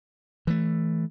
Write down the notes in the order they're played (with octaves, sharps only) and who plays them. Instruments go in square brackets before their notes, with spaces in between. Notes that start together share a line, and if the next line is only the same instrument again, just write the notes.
[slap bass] E3 A3